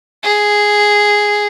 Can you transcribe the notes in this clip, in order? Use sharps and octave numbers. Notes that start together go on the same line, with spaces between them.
G#4